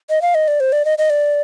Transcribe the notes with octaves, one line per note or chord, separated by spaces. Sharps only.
D#5
F5
D#5
D5
C5
D5
D#5
D#5
D5